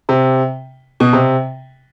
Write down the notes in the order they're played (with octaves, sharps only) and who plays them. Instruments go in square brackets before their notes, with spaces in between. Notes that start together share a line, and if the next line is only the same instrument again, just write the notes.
[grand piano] C3
B2
C3